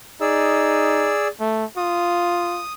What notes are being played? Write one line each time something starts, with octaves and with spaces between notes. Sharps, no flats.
D#4 G#4 D5 E6
A3
F4 D#6